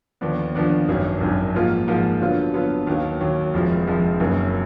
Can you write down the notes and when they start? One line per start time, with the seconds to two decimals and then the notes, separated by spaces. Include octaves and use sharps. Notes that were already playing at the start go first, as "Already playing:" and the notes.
0.21 D#2 D3 F3 B3 D4
0.55 D#2 D3 F3 B3 D4
0.88 G#1 F#2 D#3 F#3
1.21 G#1 F#2 D#3 F#3
1.54 G#2 F3 A#3 F4
1.88 G#2 F3 A#3 F4
2.21 D3 F#3 B3 F4
2.54 D3 F#3 B3 F4
2.87 D#2 D#3 F#3
3.20 D#2 D#3 F#3
3.54 F1 F2 F3 G#3
3.87 F1 F2 F3 G#3
4.20 F#1 F#2 D#3 F#3 A#3